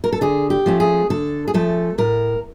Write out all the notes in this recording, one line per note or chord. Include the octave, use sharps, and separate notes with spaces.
A#4
A4
D3 G#4
G4
F3 A3 C#4
G#4
D3 A4
G#4
F3 A3 C#4 A4
A2 A#4